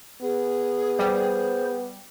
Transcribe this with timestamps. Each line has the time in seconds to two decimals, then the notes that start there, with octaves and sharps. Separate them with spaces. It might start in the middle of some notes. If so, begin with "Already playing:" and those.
0.22 B3 G#4
0.99 G3 C5